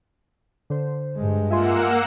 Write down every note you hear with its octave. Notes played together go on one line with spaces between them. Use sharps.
D3 C5
G2 G#3
A#3 F4 E5 F#5 G#5 C6 E6